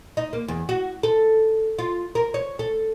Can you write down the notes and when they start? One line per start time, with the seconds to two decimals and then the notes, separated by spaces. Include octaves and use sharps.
0.17 D#4
0.33 A#3
0.48 E2
0.69 F#4
1.03 A4
1.78 F4
2.15 A#4
2.34 C#5
2.59 A4